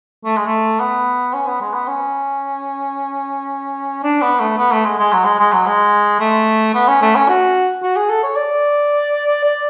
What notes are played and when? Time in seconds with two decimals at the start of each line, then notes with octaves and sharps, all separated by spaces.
0.25 A3
0.36 G#3
0.46 A3
0.80 B3
1.34 C#4
1.47 B3
1.61 G#3
1.74 B3
1.88 C#4
4.03 D4
4.22 B3
4.40 A3
4.57 B3
4.72 A3
4.85 G#3
4.99 G#3
5.13 F#3
5.25 G#3
5.40 G#3
5.52 F#3
5.67 G#3
6.20 A3
6.74 B3
6.88 C#4
7.02 A3
7.15 C#4
7.28 F#4
7.83 F#4
7.96 G#4
8.09 A4
8.23 C#5
8.36 D5
9.44 D5